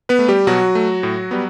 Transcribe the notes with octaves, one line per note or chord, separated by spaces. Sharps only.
B3 B4
A3
G3 G4
B2 F#3 F#4
A3
A2
G3 B3